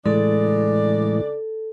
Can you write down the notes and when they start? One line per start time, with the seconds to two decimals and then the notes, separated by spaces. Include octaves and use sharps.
0.06 A2 C#3 E3 G#3 D4 A4 D5